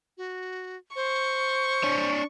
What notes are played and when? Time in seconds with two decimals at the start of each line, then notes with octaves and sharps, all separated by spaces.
0.18 F#4
0.96 C5 C#6
1.83 D4 C#5